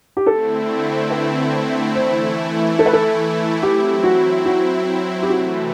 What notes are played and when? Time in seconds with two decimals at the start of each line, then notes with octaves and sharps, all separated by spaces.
0.17 G4
0.26 D3 A3 C4 E4 A4
1.10 B4
1.95 E3 A3 E4 C5
2.79 A4
2.86 B4
2.93 A4
3.62 F#3 C4 E4 G4
4.04 F#4
4.46 F#4
5.22 G4
5.30 C3 E3 A3 F#4